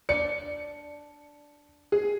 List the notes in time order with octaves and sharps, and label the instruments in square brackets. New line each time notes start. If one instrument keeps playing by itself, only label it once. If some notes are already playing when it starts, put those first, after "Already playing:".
[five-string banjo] D4 D5 [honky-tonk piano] C#7
[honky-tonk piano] G#4